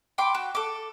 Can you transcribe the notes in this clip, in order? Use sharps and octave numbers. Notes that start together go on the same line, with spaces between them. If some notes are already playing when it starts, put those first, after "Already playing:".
G5 B5 C6 D6
F#4
A4 D6